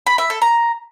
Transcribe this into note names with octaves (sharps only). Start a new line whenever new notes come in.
B5
E5
A4
A#5